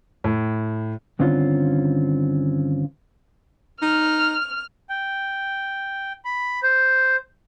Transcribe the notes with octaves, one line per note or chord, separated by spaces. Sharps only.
A2
G2 D3 D#3 C4 C#4 F4
D#4 F6
G5
B5
C5